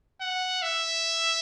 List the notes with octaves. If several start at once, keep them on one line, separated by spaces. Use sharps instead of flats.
F#5
E5